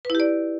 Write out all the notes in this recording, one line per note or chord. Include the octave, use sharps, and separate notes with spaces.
E4 G4 B4 D5